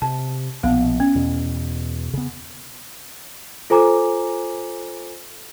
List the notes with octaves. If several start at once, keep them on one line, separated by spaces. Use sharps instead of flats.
C3 A5
A#1 B2 B3 F5
C#4
E2 B2
C#3 B3
F4 A4 C5 G#5 A#5 D6